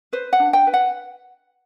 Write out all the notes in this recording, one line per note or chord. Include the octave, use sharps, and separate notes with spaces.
B4 C5
F#5
D4
G5
B4
F#5